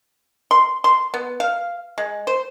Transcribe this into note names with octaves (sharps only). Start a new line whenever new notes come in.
C6
C6
B3
F5
G#3
C5